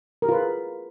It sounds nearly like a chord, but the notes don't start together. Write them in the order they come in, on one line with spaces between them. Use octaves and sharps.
A#4 G4 F4 B4 G#4